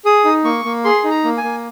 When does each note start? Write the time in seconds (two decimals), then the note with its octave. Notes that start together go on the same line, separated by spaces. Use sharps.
0.05 G#4 D#6
0.25 D#4
0.44 A#3 C#6
0.65 A#3
0.84 G#4 C6
1.04 D#4
1.11 A#5
1.25 A#3
1.38 G#5
1.44 A#3